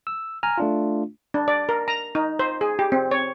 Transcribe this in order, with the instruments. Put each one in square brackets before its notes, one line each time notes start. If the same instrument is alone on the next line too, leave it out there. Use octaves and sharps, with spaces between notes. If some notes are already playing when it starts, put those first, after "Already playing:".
[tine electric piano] E6
G#5 A#5 F6
A3 D4 F4
[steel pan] D4
D5
A#4
A#5
D#4
C5
G#4
G4
C4
C#5